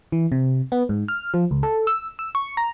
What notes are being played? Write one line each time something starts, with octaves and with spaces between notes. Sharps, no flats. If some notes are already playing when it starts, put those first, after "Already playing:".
E3
C3
B3
G#2
F6
F3
C#2
A4
E6
E6
C#6
A#5